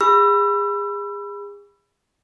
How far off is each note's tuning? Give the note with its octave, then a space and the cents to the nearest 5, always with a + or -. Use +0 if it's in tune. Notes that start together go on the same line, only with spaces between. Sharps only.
G#4 -35 B5 +0 E6 +30